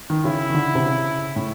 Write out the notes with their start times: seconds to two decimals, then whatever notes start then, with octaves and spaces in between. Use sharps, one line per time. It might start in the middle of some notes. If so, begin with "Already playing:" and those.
0.10 D#3
0.24 C#3 E4
0.50 D#3
0.54 D3
0.75 C3
0.86 C#3
1.36 A2